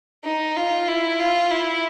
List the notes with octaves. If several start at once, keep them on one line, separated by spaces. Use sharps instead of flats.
D#4
F4
E4
F4
E4